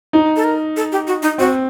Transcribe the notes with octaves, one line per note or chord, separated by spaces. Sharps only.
D#4
A4
A#4
A4
G4
F#4
D#4
C4 F#4